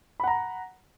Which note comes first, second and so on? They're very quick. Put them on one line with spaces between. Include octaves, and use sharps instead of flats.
B5 F#5 A#5